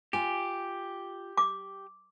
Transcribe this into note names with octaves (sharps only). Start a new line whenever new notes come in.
F4 G4 G#5
D6